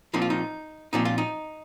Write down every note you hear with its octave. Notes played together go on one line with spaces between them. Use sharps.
A#2 F3 C4 D#4
F4
D#4
A#2 F3 C4 D#4
F4
D#4